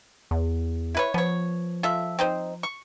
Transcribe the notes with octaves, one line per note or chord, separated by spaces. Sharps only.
E2
E4 B4 C#5
F3 B3 C#5
F4 A4 E5
C4 D#4 C5
C#6